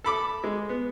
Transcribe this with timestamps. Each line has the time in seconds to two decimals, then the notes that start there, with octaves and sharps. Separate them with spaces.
0.04 A4 B5 D6
0.44 G#3
0.69 B3